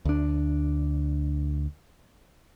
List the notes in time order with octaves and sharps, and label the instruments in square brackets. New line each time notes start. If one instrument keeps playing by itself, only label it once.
[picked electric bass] D2 D4